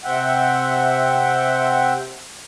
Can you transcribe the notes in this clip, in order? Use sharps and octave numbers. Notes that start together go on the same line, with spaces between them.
C3 C4 E5 F#5 G5